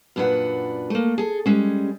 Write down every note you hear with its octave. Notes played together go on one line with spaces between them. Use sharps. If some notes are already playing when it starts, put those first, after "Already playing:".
F#2 A#2 D4 A#4 B4 F#5
A3 A#3
G#4 A4
G3 G#3 C#4